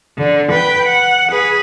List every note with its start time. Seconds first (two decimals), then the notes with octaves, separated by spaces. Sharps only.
0.18 D3
0.52 B4 G5
0.86 F#5
1.31 G#4 B4